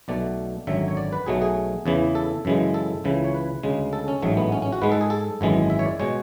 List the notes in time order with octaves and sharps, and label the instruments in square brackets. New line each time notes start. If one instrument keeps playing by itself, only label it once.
[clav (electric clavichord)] B1 B2 A3 D5
G#1 F#2 D3 F#3 E5
C#5
D5
B4
B1 B2 F#3 A3 G#4
G#4
E2 C#3 E3
A4
F#2 C#3 E3 G#3
A4
C#2 C#3 E3
C#5
B4
D2 C#3 G#3
A4
C#4
A1 G#2 F#3 A3
B3
C#4
C#4
F#4
G#2 G#3 B4
A4
G#4
A4
G#1 F#2 E3 G#3
E5
C#5
D5
B2 G#3 C#5